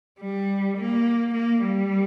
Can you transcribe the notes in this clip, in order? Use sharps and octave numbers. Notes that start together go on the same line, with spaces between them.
G3
A#3
A#3
G3